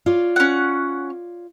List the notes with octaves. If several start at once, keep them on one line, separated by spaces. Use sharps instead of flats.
F4 C#5 D5
C#4 F#5